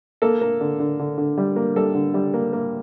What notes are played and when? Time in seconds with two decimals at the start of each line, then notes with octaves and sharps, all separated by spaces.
0.22 A#3 A4
0.41 A#3
0.61 D3
0.80 D3
0.99 D3
1.18 D3
1.38 G3
1.56 A#3
1.76 G3 A4
1.94 D3
2.14 G3
2.34 A#3
2.53 A#3